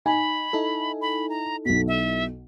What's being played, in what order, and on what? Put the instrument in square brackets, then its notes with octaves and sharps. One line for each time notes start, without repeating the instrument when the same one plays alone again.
[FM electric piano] D#4 [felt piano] G#5 [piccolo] B5
[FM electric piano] D#4 E4 A4
[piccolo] B5
A#5
[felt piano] B1 B2 [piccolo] B6
[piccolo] E5